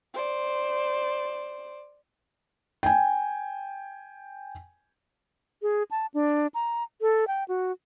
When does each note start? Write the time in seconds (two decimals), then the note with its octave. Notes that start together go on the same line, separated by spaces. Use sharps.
0.14 C5 D5
2.83 G5 G#5
5.62 G#4
5.91 A5
6.14 D4
6.54 A#5
7.01 A4
7.27 G5
7.48 F#4